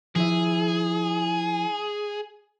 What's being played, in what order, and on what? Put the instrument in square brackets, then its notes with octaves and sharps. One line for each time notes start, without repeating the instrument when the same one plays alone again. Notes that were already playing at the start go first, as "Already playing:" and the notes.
[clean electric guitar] F3 E4 E5 [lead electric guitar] G#4